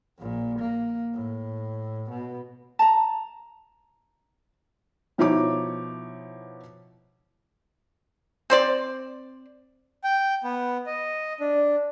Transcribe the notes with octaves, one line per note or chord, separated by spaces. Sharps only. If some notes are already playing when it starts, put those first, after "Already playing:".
A#1 A#2
A#3
A2
B2
A5 A#5
B2 F3 D#4 E4 C#5 D6
C4 C5 D5
G5
B3
D#5
D4